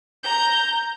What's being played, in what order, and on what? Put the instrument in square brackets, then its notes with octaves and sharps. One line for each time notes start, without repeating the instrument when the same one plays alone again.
[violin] A#5 G6